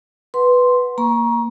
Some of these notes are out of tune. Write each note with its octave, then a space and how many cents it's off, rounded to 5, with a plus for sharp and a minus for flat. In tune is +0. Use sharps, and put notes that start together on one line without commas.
B4 +0 F#5 +0 C6 +0
A#3 +0 A#5 +25 C#6 +0